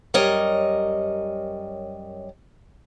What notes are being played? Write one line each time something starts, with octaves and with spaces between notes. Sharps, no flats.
F#2 G3 A#4 C#5 D#5